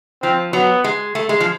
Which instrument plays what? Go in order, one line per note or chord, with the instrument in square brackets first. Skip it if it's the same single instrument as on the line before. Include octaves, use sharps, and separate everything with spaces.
[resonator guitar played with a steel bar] F3 [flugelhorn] C4
[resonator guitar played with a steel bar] F#3 [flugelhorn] B3
[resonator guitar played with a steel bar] G#3
A3
G#3
F3